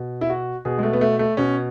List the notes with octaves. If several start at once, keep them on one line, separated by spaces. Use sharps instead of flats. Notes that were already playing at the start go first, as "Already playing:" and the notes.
Already playing: B2
E4
F#4
B2 G#4
G#3
A3
B3
A3
A3
B2 C#4